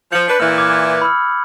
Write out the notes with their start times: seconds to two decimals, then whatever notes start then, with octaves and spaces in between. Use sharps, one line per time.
0.12 F3 G6 C#7 F#7
0.28 D4 B4
0.40 A#2 E3 F6
0.58 D6 F6 G#6
1.01 B5 E6 F6